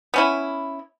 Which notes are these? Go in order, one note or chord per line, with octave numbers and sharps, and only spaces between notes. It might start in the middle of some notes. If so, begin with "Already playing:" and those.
B3 C#4 E4